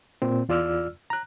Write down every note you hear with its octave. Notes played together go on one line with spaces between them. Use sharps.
A#2 C4
E2 F4 D5 E6 F6
A#5 F#6